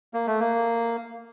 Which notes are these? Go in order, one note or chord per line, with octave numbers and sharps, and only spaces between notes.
A#3
A3
A#3